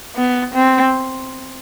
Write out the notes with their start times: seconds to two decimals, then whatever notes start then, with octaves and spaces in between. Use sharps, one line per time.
0.16 B3
0.54 C4